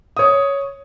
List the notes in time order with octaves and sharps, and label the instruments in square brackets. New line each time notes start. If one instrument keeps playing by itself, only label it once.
[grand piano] C#5 D#6